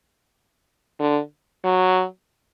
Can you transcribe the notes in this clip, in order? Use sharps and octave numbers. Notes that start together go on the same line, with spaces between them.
D3
F#3